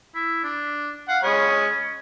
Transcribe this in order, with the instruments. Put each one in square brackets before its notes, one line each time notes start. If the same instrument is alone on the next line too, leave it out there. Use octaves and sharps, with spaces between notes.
[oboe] E4
D4
[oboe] F5 [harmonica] F#5
[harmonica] G#3 C#5 B5 [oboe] C#4